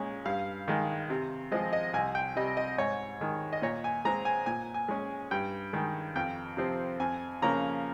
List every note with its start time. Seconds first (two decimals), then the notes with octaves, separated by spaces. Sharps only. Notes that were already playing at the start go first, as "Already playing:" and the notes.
Already playing: A#2 G#3 C#4
0.25 G2 F5
0.68 D#3 G#3
1.10 C3
1.51 F3 G#3 C4 D#5
1.73 D#5
1.93 C2 G#5
2.15 G5
2.36 C3 G3 D#5
2.57 D#5
2.78 G#2 C#5
3.21 D#3 G#3
3.53 D#5
3.62 A#2 C#5
3.84 G#5
4.05 G#3 C4 A#5
4.25 G#5
4.46 A#2 G#5
4.74 G#5
4.88 G#3 C#4
5.31 G2 G5
5.73 D#3 G#3
6.16 F2 G5
6.57 C3 F3 C4
7.00 F2 G#5
7.42 C#3 F3 A#3 C#4 A#5